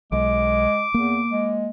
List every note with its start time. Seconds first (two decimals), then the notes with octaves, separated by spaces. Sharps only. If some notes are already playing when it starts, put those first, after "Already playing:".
0.12 B1 G#3 D6
0.94 E2 A#3
1.31 G#3